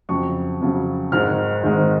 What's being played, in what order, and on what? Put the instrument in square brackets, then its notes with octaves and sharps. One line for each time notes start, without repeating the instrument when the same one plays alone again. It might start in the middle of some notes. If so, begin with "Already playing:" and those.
[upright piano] F2 C#3 F#3 C#6
F2 C#3 F#3
G#1 G#2 D#3 G#3 F6
G#1 G#2 D#3 G#3